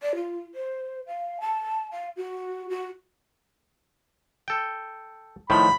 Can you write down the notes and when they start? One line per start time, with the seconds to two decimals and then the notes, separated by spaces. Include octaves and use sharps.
0.02 D5
0.15 F4
0.55 C5
1.07 F5
1.41 A5
1.92 F5
2.17 F#4
2.69 F#4
4.48 A4 G5
5.50 A2 D#3 F3 B5